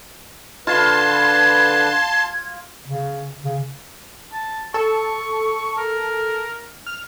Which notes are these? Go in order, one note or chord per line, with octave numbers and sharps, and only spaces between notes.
D3 F4 B4 A5 C6 G#6
C#3
C#3
A5
A4 C#6
A#4
F6